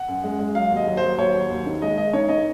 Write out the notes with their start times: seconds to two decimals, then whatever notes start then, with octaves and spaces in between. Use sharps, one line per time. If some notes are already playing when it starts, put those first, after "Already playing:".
Already playing: F#5
0.08 F#2
0.24 G#3
0.39 G#3
0.55 F#3 F5
0.71 D#2
0.77 D#5
0.87 F#3
0.97 C5
1.03 F#3
1.18 D#2 C#5
1.34 F#3
1.50 D#2
1.66 D#3
1.82 G#3 D#5
1.98 G#3 D#5
2.13 D#3 C#5
2.29 D#3 D#5